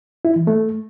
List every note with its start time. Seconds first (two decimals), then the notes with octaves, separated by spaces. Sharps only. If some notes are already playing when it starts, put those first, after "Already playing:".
0.25 E4
0.36 E3
0.47 A3